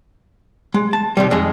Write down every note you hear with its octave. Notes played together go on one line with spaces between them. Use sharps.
G#3
A5
D#2 C3 G3
F2 G#3 D#4